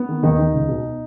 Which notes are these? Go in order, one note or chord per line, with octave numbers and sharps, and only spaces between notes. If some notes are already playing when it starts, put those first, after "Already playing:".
Already playing: B3
D#3
D#2 D#3 D#4
D#3
C#2
B2